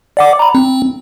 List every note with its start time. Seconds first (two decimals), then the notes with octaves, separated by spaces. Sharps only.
0.17 D5 F#5 D6
0.39 A#5 B5
0.55 C4